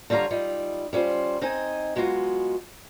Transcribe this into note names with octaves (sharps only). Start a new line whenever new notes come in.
D3 G3 E4 F4 C#5 A#5
G3 D#4 F4
G3 C#4 F4 C5
C4 D#4 D#5 G#5
F#3 G#3 B3 F4 F#4